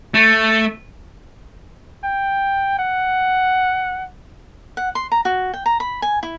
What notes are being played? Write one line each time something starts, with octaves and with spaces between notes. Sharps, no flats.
A3
G5
F#5
F#5
C6
A#5
F#4
G5
A#5
B5
G#5
E4